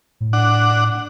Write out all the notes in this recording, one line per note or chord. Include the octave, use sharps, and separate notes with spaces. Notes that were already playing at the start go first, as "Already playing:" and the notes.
A2
D4 F#5